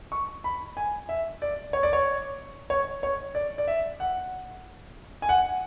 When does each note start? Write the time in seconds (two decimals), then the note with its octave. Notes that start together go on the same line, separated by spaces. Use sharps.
0.12 C#6
0.44 B5
0.77 G#5
1.09 E5
1.42 D5
1.73 C#5
1.83 D5
1.93 C#5
2.70 C#5
3.03 C#5
3.35 D5
3.58 D5
3.68 E5
4.00 F#5
5.22 G#5
5.29 F#5